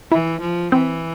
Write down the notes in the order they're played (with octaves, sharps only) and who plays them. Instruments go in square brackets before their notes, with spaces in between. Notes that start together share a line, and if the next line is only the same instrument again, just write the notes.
[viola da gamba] E3 [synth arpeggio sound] E4
[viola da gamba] F3
[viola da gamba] E3 [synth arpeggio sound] C4